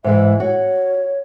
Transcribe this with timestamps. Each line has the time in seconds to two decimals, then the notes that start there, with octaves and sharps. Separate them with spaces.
0.04 G#2 E3 G#3 E5
0.40 F#4 C#5